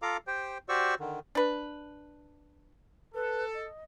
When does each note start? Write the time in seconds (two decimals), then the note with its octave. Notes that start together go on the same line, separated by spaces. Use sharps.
0.02 F4 A4 F5 A#5 D6
0.27 G4 C5 G5
0.69 F#4 G4 C5 D5 C#6 E6
1.00 D3 D#3
1.35 D4 B4
3.15 A4 B4
3.54 D#5